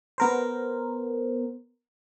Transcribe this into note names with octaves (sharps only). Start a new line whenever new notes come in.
B3 A#4 C5